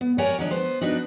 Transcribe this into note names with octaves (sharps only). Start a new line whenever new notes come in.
B3
G4 A#4 C#5 D5 F#5 G#5
D#3 F3 D4
B3 C5
D4 D#4 F#4 B4